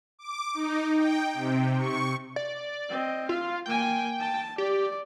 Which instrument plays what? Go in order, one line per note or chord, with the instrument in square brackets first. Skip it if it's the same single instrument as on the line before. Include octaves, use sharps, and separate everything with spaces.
[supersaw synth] D6
D#4
G5
C3
C#6
[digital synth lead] D5
[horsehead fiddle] C4 D#5
[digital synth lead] F4 [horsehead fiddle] F5
[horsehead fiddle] A#3 G#5 [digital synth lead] G5
[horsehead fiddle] A5
[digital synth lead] G4 [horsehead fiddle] D5